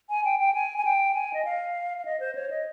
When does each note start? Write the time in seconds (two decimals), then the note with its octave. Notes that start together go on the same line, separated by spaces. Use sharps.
0.10 G#5
0.25 G5
0.40 G5
0.54 G#5
0.78 G#5
0.85 G5
1.14 G#5
1.34 D#5
1.45 F5
1.98 F5
2.05 D#5
2.20 C5
2.35 C#5
2.50 D#5